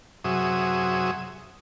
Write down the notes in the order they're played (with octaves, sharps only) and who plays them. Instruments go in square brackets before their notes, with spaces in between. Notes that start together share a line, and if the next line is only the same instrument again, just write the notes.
[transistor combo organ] F#2 C3 F#3 G#4 E5 D#6